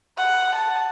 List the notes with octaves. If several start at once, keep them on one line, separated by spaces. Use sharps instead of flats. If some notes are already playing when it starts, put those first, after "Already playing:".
F#5
A5